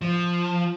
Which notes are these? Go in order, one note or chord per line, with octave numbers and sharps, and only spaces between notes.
F3